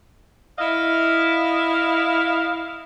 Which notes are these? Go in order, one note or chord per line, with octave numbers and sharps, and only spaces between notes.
E4 D#5 F5